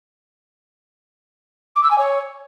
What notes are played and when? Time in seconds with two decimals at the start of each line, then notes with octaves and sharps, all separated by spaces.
1.76 D6
1.83 E6
1.90 G#5
1.98 C#5